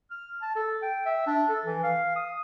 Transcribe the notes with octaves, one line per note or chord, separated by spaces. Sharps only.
F6
A5
A4
G5
E5
D4
A4
E3
F5
D#6